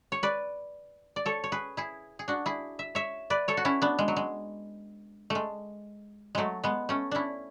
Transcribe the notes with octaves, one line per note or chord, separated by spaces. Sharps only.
C#5
B4 D5
D5
A4 C#5
C#5
G#4 B4
E4 G#4
G#4
D4 F#4
E4 G#4
E5
C#5 E5
B4 D5
A4 C#5
F#4
C#4 E4
B3 D4
G#3
F#3
G#3
G#3 A3
F#3 G#3 A3
G#3 B3
A3 C#4
C#4 D4 E4